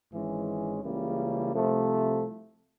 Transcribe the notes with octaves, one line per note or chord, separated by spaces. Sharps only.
G#1 G#2 E3 G#3 C#4
C#2 C#3 E3 G3 A#3
C2 C3 F3 A3